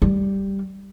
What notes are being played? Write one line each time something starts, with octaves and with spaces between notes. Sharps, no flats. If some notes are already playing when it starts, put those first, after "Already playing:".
G3